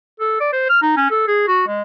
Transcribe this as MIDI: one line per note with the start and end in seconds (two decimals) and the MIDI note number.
0.20 0.36 69
0.40 0.50 74
0.53 0.66 72
0.69 0.79 89
0.82 0.95 63
0.97 1.08 61
1.11 1.25 69
1.28 1.47 68
1.48 1.63 66
1.67 1.82 56